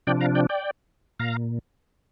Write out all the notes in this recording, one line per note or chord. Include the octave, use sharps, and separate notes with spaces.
C3 F3 D4 D5 G5
F5 A#5
D5 G5
D5 G5
A#2 F5 A#5